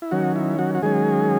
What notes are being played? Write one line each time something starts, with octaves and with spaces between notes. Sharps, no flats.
E4
D#3 F#3 C#4 F#4
E4
F#3 F#4
F#4
D#3 F#3 G#3 C#4 G#4